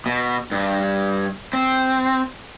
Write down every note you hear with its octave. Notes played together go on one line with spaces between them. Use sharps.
B2
G2
C4